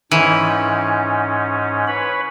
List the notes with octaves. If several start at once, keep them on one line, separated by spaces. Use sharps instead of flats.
G#2 E3 C#4
B4 C#5 B5